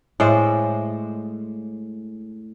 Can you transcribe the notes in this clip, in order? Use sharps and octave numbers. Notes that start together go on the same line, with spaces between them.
A2 G#3 C5 D5